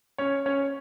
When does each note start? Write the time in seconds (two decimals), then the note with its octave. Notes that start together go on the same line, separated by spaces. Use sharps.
0.18 C#4 C#5
0.46 C#4 C#5